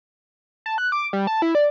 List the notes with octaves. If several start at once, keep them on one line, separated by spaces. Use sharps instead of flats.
A5
F#6
D6
G3
A5
E4
D5